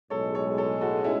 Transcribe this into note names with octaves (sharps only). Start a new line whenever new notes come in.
B1 A2 G#3 A4 C#5
A4 C#5
A4 C#5
F#4 A4
C#4 E4